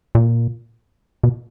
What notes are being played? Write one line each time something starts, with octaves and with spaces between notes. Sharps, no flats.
A#2
B2